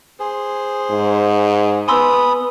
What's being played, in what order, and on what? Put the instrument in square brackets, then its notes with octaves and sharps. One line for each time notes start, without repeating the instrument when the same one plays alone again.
[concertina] G#4 [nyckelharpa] C5
[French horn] G#2
[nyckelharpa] B3 [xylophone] G#5 C6 E6 [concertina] B5 D#6